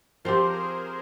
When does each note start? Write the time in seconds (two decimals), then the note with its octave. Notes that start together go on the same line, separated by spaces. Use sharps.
0.25 F3 C4 G4 A#4
0.34 C5
0.43 A#4
0.54 G#4